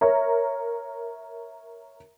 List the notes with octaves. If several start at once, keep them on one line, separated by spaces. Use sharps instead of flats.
A#4 C#5 E5 A#5